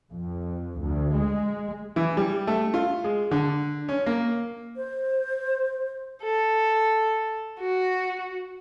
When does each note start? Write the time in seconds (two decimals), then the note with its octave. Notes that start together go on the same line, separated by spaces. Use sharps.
0.12 F2
0.80 D2
1.15 G#3
1.96 E3
2.17 G3
2.47 A3
2.74 F4
3.04 G#3
3.31 D3
3.89 C#4
4.06 A#3
4.76 C5
6.23 A4
7.60 F#4